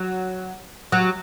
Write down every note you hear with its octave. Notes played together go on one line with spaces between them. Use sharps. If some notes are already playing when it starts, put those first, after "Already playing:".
Already playing: F#3
F#3